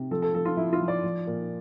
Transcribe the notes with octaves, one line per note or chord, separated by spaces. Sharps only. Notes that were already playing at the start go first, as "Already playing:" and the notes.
Already playing: C3
F3 A4
A4
F3 A4
F4
F3 E4
F4
F3
D5
F3
A#2